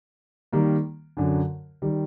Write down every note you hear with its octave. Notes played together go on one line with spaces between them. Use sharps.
D#3 G3 A#3
F#2 D3 F#3
D#3 G3